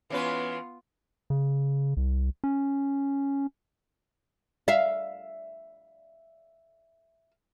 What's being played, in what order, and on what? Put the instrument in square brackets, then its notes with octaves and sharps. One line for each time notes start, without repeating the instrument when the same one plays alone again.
[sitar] E3 C#4 B4 [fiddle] B3 F4
[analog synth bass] C#3
C2
C#4
[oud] E5 F5